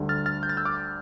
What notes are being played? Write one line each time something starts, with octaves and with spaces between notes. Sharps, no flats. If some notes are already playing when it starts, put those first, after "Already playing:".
Already playing: D2 D3 G3
F6 A6
F6 A6
G6
A6
E6 G6
D6 F6